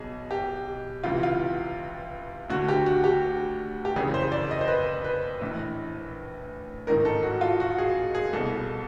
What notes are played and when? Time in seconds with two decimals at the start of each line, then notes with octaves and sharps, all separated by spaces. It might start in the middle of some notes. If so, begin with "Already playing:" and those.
Already playing: B1 B2 G#4
0.31 G4
1.03 C#2 C3 E3 F4
1.23 F4
2.50 D2 F#4
2.53 D3
2.68 G4
2.86 F#4
3.04 G4
3.85 G4
3.96 F#1 F2 C#3 E3 G#4
4.14 C5
4.32 D5
4.51 D#5
4.61 C5
4.68 B4
5.04 B4
5.41 A#1 A2 E3
6.87 A1 G#2 D#3 A#4
7.05 A4
7.23 F#4
7.41 F4
7.60 F#4
7.78 G#4
8.15 G#4
8.33 C2 B2 A4